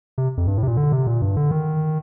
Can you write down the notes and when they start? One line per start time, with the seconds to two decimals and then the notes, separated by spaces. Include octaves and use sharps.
0.18 C3
0.37 F2
0.47 G2
0.58 A2
0.63 C3
0.67 A#2
0.77 D3
0.92 C3
1.07 A#2
1.22 G2
1.36 D3
1.51 D#3